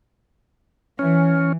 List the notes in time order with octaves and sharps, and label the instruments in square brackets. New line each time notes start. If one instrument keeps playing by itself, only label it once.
[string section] E3 [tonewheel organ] C#4